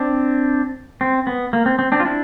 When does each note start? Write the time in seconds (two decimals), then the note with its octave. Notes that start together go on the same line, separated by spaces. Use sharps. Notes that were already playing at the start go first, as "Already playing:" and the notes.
Already playing: C4 D4
1.01 C4
1.27 B3
1.53 A#3
1.66 C4
1.79 C4
1.92 C4 D4
2.00 F4
2.05 D4 E4